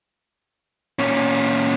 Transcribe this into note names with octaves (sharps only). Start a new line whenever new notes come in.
A#2 C#4